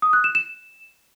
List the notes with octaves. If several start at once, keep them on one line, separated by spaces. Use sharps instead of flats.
D#6
F#6
E7
E7